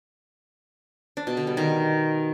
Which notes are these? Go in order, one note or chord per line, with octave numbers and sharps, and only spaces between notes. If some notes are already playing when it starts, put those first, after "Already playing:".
D4
B2
D3
G3
D#3